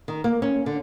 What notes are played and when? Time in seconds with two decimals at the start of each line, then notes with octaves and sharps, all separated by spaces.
0.08 D#3
0.24 A#3
0.42 C#4
0.66 D3